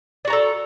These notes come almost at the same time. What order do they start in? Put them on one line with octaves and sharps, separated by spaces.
D5 F#4 A#5 A4